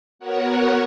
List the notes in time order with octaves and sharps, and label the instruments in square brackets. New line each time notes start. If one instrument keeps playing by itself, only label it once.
[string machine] B3 F#4 A#4 C#5 F#5